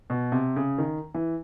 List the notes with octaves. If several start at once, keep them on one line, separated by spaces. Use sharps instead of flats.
B2
C3
C#3
D#3
E3